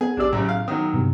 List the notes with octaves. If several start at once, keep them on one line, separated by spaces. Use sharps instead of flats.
B3 G#4
A#1 D4 G4 D5 E6
F#2 A2 C#3
F5
D#3 F#3 D#6
G2 C3 B3